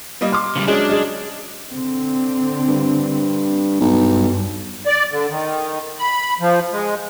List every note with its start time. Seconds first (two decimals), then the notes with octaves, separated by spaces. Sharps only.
0.21 G3 A#3 D#5
0.32 C6 D6 F6
0.56 C#3 F#3 G3
0.67 F#3 G#3 C#4 D4 G#4
0.89 G#4 D#5
1.71 D3 C4
2.68 G2
3.81 B1 G2
4.85 D5
5.12 D3
5.30 D#3
5.99 B5
6.40 F3
6.72 G#3